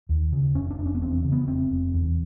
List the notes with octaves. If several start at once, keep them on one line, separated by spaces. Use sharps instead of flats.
D#2
C#3
F1 C#4
D4
F1
C#4
B3
E2 C4
C#3
B3
F1 C4
F1
E2